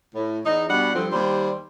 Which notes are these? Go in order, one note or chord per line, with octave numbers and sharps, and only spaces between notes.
A2
E2 D#4
B2 G3 D4 F#5
G2 D3 F3 C4
D#2 G3 C5